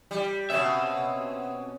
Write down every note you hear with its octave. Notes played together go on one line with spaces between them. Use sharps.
G3
B2 C4 C#4 E5